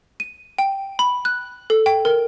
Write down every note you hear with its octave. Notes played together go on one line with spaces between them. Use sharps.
D#7
G5
B5
F#6
A4
G5
A#4